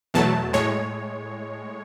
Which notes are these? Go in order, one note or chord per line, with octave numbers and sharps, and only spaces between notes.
E2 B2 F#3 A3 A5
A2 G#3 C#5